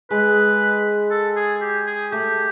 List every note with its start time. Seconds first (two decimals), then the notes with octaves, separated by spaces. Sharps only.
0.10 G#3 B4
1.11 A4
1.36 G#4
1.61 G4
1.87 G#4
2.11 A3 G4